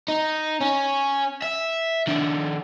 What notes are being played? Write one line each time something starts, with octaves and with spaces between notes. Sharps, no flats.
D#4
C#4
E5
D#3 D4